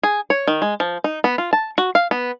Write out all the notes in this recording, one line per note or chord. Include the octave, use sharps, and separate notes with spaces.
G#4
C#5
D#3
G#3
F3
D#4
B3
F4
A5
F#4
F5
B3